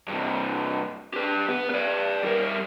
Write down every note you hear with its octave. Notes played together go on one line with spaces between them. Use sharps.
G2 C3
G4 B4
B3
B4 D5
G3 A#4